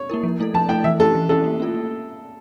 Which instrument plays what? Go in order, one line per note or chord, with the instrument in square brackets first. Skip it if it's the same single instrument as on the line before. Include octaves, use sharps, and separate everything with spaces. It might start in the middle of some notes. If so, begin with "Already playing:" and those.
Already playing: [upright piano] C#5
[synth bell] A#3 E4 A#4
F3
A3 E4 A4
[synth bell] F3 [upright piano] A5
[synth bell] A3 E4 A4 [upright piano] G5
[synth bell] E3 [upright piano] E5
[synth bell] A3 C#4 E4 G4 [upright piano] A4
[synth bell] E3
[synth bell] A3 C#4 E4 G4 [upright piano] A4
[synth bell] A#3
C#4 F4 A4
A#3